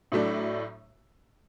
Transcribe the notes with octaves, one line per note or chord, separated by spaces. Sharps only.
A2 F#3 A3 D4